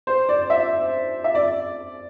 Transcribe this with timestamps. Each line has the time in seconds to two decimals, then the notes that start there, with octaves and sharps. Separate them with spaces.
0.07 C5
0.29 D5
0.50 E5
1.24 E5
1.35 D5